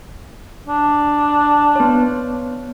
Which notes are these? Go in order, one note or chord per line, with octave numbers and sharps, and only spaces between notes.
D4
B3 C#5